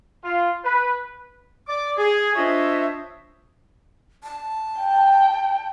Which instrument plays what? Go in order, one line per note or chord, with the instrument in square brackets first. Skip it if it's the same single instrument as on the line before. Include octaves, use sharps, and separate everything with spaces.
[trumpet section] F4
B4
[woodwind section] D5 D6
G#4
D4 F4 C5 C#5 D#5 E5
[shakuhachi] A5
[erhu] G5